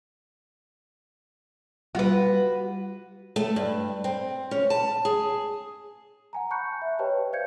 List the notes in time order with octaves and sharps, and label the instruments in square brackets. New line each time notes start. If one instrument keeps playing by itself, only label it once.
[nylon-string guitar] G3 F4 [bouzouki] F#4 B4
[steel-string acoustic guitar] A3
G2
C4
C#4
A5
G#4
[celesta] F#5 G#5 A#5
A5 B5 C#6 F#6 G6 C#7
E5
G4 B4 C#5 D#5 G5 A5
C5 D5 F5 G6 G#6 C#7